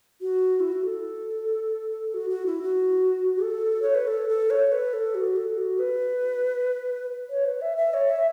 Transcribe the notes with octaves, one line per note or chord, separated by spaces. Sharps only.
F#4
E4
F#4
A4
F#4
F#4
E4
F#4
A4
C#5
B4
A4
A4
C#5
B4
A4
F#4
A4
F#4
B4
C#5
B4
E5
E5
C#5
E5